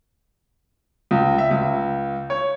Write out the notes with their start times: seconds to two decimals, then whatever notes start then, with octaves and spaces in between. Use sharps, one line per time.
1.11 C#2
1.38 E5
1.51 C#2
2.30 C#5